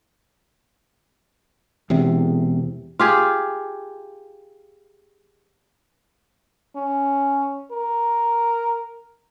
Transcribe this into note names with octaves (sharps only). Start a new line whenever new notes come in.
E1 E2 C3
F4 G4 G#4
C#4
A#4